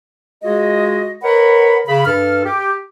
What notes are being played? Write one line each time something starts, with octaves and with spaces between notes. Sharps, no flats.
G#3 F4 F#4 G#4 D#5
A#4 B4 C#5 D#5 F#5 B5
C#3 B5
G2 A4 F6
G4